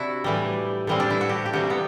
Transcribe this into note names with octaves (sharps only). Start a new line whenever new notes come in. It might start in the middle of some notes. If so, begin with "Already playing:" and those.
Already playing: C3 D4 E4 F#4
A2 E3 G3
A2 E3 G3 C4
D4
E4
F#4
G4
G4
C3 E3 G3 F#4
B3